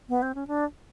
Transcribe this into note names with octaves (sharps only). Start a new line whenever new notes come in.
B3
C4
C#4
D4